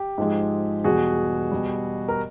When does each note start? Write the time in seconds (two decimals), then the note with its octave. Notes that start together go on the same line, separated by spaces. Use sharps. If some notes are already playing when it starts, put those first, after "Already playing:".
Already playing: G4
0.18 G#2 F3 G#3
0.84 E2 B2 G3 F#4 G#4
1.52 B2 G3
2.09 A#4